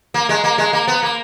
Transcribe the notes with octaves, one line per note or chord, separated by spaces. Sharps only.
A#3
G#3
A#3
G#3
A#3
B3
A#3